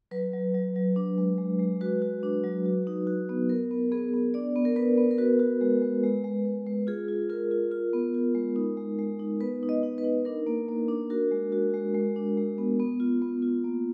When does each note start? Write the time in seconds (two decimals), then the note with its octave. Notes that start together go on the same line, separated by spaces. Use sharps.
0.11 F#3 B4
0.33 F#3
0.55 F#3
0.76 F#3
0.96 D4
1.18 G#3
1.38 G#3
1.59 G#3
1.81 F#4 B4
2.02 F#4
2.23 D4
2.44 F#3
2.66 F#4
2.87 D#4
3.07 F#4
3.29 B3
3.49 B3 A#4
3.71 B3
3.92 B3 G#4
4.13 B3
4.34 D4 D5
4.56 B3
4.65 A#4
4.76 B3 B4
4.98 B3
5.11 A#4
5.18 F#4 B4
5.40 F#4
5.61 G#3
5.82 G#3
6.03 G#3
6.24 G#3
6.46 G#3
6.66 G#3
6.87 F4 G#4
7.08 F4
7.29 F4 A#4
7.51 F4
7.72 F4
7.93 B3
8.14 F4
8.35 G#3
8.56 D#4
8.77 G#3
8.99 G#3
9.19 D#4
9.41 B3 B4
9.63 D#4
9.69 D#5
9.83 D#4
9.98 B4
10.04 D#4
10.25 D4 A#4
10.47 A#3
10.68 A#3
10.88 D4
11.10 F#4 A#4
11.32 G#3
11.52 F#4
11.74 G#3
11.95 G#3
12.16 D4
12.37 G#3
12.58 B3
12.80 B3
13.00 F4
13.22 B3
13.42 F4
13.64 A#3